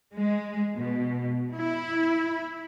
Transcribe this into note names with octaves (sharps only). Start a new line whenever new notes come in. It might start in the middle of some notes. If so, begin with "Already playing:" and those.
G#3
B2
E4